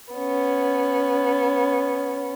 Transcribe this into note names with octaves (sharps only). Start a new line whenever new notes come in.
B3 C#4